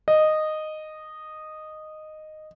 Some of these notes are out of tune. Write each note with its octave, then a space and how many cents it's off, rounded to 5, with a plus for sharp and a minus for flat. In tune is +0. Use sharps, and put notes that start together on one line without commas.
D#5 -10